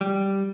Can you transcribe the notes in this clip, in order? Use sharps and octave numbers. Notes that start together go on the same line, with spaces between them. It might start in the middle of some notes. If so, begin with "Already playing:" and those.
G3